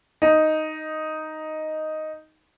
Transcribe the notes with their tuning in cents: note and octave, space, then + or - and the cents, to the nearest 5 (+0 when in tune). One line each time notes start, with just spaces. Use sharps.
D#4 +0